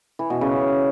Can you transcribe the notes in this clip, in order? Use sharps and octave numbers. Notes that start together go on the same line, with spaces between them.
E3
B2
C#3